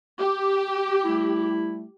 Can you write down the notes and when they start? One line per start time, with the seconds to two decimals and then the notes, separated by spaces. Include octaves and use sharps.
0.19 G4
1.03 G3 A3 E4